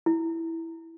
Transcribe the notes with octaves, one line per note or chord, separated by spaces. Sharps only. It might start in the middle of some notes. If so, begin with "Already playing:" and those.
E4